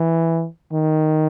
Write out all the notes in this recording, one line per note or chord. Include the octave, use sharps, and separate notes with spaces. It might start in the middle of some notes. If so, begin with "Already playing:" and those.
Already playing: E3
D#3